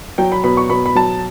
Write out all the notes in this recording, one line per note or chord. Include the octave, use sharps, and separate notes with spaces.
F#3 G5
B5
B2 B5
C#6
B2 B5
B5
F#3 A5